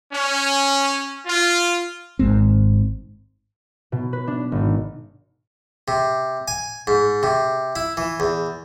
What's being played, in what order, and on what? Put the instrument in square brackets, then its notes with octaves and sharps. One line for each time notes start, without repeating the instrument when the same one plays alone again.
[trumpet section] C#4
F4
[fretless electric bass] G#1 G#2 C4
[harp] B2
B4
D4
G#1
[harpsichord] C3
G#5
G#2
C3
E4
E3
E2